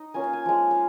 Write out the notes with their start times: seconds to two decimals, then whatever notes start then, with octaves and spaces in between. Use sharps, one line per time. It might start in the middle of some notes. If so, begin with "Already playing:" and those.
Already playing: D#4 D#5
0.14 A#3 C#4 F4 G#5
0.24 F5
0.33 G#5
0.46 F3 G#3 F4
0.71 F5